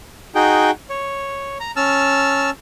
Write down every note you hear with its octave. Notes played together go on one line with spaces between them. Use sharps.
D#4 F#4 G#4 G5
C#5
A#5
C#4 A5 E6 F6